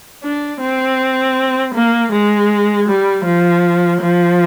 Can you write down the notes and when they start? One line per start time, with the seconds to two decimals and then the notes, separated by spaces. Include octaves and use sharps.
0.23 D4
0.61 C4
1.75 A#3
2.12 G#3
2.88 G3
3.25 F3
4.01 F3